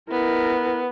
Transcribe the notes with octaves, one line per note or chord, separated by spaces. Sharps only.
B3 E4 A#4